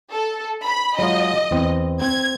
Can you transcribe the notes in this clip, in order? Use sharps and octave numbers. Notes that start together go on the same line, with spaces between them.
A4
B5
F#3 G#3 F4 D#5
E2 C4
C4 G#6